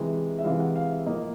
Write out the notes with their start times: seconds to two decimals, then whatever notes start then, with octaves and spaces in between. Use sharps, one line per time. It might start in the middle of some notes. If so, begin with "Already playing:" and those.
Already playing: C3 E3 G#3
0.38 E5
0.44 C3 E3 G#3 F5
0.60 F#5
0.76 F5
0.91 E5
1.06 A2 F3 A#3 D#5